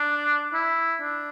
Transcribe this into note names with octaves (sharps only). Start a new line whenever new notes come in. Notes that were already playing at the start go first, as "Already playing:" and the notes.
Already playing: D4
E4
D4